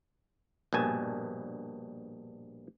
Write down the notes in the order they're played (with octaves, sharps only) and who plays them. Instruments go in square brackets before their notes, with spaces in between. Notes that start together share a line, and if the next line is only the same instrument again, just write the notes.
[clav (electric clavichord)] A#1 G2 B2 G#5 A5